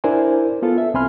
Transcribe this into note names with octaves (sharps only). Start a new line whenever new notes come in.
D4 E4 A#4 C5 D5 G#5
B3 F4 A4
E5
C2 C4 G#5 B5 C6 F6